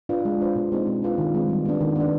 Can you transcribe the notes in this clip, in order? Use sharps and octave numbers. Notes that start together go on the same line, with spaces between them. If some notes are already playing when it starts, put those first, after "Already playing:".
D4 F4 B4
G#3
D4 F4 C5
B2
G#3 C4 D#4
G#3
D4 F4 B4
D#3
G#3 C4
G3
B3 D4
D#3
B3 D4